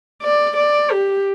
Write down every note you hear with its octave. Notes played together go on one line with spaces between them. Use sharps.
D5
D5
G4